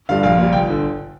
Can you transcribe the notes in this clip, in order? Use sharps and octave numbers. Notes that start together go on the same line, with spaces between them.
G2 D3 G3 F5
A#1 F5
A#2 G3
G1 G5
D3